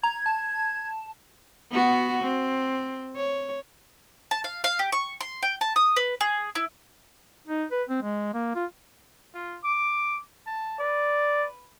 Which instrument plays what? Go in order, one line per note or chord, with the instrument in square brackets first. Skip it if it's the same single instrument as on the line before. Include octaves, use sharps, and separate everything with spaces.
[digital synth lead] A#5 [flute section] G#6
[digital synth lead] A5
[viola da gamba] B3 F#4
C4
C#5
[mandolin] A5
F5
F5
G4
C#6
C6
G5
A5
D#6
B4
G#4
E4
[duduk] D#4
B4
C4
G#3
A#3
F4
[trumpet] F4
D6
A5
[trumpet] B4 [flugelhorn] D5